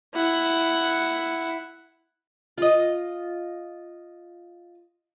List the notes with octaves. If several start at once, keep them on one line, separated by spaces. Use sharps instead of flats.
E4 F#5
F4 D#5